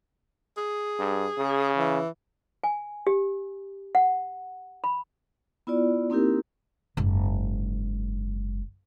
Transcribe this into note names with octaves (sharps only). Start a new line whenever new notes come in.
G#4
G2
C#3
E3
G#5
G4
F#5
B5
B3 E4 F4 D5
A#3 C4 D#4 E4 G4 A#4
F#1 G#2